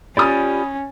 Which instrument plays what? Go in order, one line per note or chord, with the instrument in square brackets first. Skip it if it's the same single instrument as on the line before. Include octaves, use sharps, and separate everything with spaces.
[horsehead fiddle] C#4 [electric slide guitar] F4 G4 D5 [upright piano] B5 D#6 A6